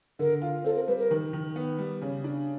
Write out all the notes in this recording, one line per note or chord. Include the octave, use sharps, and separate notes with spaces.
D3 A#4
F4
C4 A4
A#4
G3 B4
A#4
D#3
D#3
B3
G3
C#3
D4